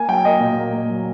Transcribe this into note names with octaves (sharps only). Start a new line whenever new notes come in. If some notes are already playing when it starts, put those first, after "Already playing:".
Already playing: A#3 G#5
F#3 G5
A#3 D#5
A#2
A#3
A#3
F#3